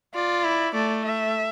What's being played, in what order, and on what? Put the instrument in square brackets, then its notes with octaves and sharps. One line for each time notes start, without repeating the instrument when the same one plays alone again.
[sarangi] F4 [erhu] D5
[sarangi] E4
[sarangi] A3 [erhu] D5
[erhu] E5